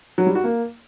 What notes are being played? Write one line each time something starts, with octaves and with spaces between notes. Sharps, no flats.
F#3
G3
F#4
A#3